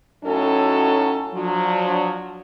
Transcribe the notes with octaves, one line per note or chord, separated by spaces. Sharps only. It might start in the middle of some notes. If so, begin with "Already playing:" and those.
A2 F#3 C#4 D#4 F#4 A4
F3 F#3 D4